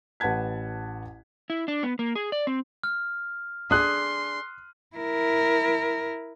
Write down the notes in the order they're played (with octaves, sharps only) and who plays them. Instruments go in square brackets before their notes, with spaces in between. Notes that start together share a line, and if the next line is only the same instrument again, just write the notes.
[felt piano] A1 B4 F#5 A5 G#6 B6
[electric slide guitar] E4
D4
B3
A#3
G#4
D5
C4
[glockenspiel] F6
[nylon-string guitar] D4 G#4 [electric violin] C6 [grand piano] D#6 F#6
[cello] E4 A#4